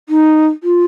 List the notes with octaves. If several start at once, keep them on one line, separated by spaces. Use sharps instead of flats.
D#4
F4